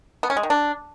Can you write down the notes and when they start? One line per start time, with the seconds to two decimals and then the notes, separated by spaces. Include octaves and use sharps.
0.23 B3
0.30 C#4
0.37 G#3
0.43 D#3
0.50 D4